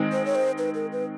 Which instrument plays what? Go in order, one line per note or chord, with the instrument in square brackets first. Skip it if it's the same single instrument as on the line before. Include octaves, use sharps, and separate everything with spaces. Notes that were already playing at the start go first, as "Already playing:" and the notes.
Already playing: [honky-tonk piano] D#3 G#3 C4 D#4
[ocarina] C5
C#5
C5
B4
A#4
B4